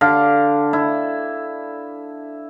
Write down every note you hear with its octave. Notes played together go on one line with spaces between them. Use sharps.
D3 F5
E4